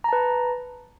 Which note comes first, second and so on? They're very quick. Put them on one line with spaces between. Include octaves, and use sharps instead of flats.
A#5 A5 B4